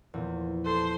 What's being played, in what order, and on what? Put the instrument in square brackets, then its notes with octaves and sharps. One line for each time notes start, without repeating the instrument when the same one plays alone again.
[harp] E2 A#2 F3
[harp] A4 [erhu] C5